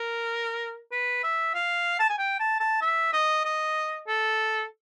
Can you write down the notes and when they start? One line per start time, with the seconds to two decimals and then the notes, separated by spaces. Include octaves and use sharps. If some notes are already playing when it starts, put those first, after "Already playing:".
Already playing: A#4
0.92 B4
1.23 E5
1.54 F5
1.99 A5
2.09 G#5
2.18 G5
2.40 A5
2.60 A5
2.81 E5
3.13 D#5
3.45 D#5
4.08 A4